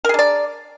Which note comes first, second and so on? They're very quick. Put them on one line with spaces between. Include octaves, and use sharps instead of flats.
A#4 G#4 D4 D5